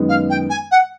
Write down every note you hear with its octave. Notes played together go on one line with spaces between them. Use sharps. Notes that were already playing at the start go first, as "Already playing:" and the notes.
Already playing: F#2 D#3 G#3 B3 D#4
F5
G5
G#5
F#5